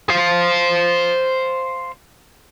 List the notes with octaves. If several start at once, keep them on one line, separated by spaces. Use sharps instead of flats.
C5 F5